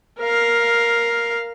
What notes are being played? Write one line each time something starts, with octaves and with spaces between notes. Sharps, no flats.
A#4 F5